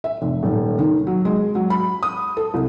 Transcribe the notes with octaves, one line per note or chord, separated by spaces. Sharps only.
E5
F1
D#1
D#3
F#3
G#3
F#3
B5
D#6
A4
C2